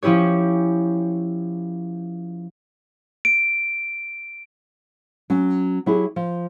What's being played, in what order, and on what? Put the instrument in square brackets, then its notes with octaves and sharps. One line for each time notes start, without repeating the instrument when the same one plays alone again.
[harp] F3 C#4 E4 G4 C#5
[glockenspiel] D7
[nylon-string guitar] F#3 C#4
F#3 E4 G4 G#4
F3